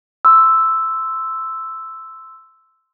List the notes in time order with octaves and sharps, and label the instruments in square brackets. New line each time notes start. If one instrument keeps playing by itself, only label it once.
[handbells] C6 E6